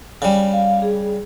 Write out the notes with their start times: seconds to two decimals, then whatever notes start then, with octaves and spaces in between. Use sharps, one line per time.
0.22 C#3 G3
0.53 F5
0.82 G#4